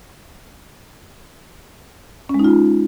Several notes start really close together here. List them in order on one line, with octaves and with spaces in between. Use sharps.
C#4 G#3 D#4 F4